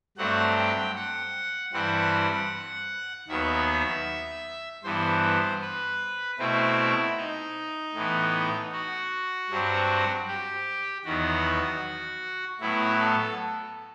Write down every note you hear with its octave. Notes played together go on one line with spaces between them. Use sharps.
G2 F#3 A3 C4 F#5
G5
F#5
G2 E3 G3 C4 F#5
D#2 D#3 F#3 B3 E5
G2 E3 B3 C5
B4
B2 A3 C4 E4
D#4
A2 E3 B3
F#4
G2 F#3 C4
G4
E2 D#3 F#3 B3 F#4
A2 F#3 B3 E4
A4